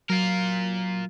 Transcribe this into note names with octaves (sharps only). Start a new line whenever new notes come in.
F#3 F4 A#4